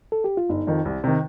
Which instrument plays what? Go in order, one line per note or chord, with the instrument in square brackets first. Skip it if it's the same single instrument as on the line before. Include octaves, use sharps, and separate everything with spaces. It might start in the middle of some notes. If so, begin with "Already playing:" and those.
[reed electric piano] A4
G4
F4
[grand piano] G1 [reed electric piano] D#4
[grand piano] F2 D#3
C2
C3 D#3